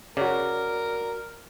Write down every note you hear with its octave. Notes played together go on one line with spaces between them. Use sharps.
C#3 F#4 A#4 D5